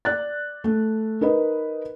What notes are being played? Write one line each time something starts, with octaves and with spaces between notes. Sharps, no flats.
D5 F#6 A6
A3
D#4 A#4 B4 D#5